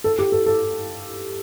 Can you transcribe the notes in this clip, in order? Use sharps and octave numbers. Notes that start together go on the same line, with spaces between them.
A4
G4
A4
A4